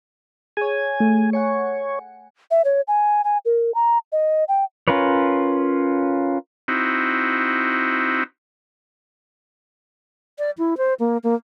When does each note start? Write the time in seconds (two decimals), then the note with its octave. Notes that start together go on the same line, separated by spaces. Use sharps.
0.57 G#4 C#5 G#5
1.00 A3
1.33 C#5 F#5 G#5 C#7
2.51 E5
2.65 C#5
2.88 G#5
3.24 G#5
3.45 A#4
3.75 A#5
4.12 D#5
4.48 G5
4.88 C#4 F4 A#4 B4 C#5
6.68 C4 D#4 E4 F#4
10.38 D5
10.58 E4
10.77 C5
11.00 A#3
11.24 A#3